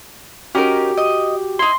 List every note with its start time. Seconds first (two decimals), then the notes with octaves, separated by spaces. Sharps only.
0.55 C#4 D#4 F#4 G4 A#4
0.97 D#5
1.59 D#4 E4 C6